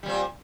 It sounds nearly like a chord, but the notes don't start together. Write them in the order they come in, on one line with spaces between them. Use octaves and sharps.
G3 A#2 C4